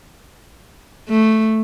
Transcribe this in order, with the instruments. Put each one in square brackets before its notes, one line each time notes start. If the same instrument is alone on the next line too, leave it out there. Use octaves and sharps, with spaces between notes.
[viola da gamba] A3